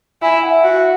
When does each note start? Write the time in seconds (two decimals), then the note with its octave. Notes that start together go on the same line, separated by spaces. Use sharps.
0.22 E4 G#5
0.43 F#5
0.50 E5
0.64 F#4
0.77 F#5